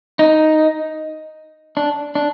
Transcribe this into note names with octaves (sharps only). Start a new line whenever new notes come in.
D#4
D4
D4